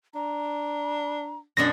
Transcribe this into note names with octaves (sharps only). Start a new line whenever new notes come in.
D4 A#5
F#2 B2 D4 A#6